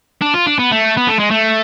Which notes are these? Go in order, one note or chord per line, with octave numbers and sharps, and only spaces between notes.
D4
F4
D4
B3
A3
B3
A3
G#3
A3